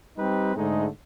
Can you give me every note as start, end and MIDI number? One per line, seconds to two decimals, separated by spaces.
0.18 0.54 55
0.18 0.54 60
0.18 0.54 63
0.18 0.54 67
0.18 0.54 71
0.56 0.87 44
0.56 0.87 50
0.56 0.87 56
0.56 0.87 57
0.56 0.87 63